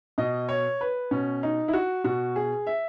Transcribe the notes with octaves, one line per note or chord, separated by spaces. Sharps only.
B2 D#5
C#5
B4
B2 C#4
D#4
E4
F#4
B2 F#4
G#4
E5